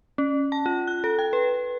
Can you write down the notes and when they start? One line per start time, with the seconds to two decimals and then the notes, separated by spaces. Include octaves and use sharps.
0.18 C#4
0.52 A5
0.66 F4
0.87 F#6
1.04 A4
1.19 G5
1.33 B4